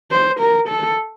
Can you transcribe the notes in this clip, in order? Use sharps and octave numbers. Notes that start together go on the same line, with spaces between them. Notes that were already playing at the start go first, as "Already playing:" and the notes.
C5
A#4
A4